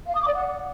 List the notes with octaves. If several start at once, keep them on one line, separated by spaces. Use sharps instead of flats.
F5
D#6
D6
D5
F#5